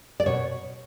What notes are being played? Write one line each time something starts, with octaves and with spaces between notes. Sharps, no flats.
D5
B2 C#5